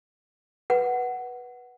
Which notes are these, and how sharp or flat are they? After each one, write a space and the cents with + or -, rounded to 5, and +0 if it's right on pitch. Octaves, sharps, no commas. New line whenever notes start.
B4 -15 F#5 +10